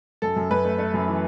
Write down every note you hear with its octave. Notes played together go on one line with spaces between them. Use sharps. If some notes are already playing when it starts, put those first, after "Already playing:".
F#2 A4
F#2
F#2 B4
A3
A3
F#2
E3